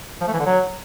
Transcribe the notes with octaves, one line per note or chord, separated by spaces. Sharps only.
F3
A3
E3
D3
F#3